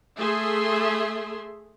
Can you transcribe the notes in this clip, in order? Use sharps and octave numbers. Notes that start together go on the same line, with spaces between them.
A3 G#4 E5 C6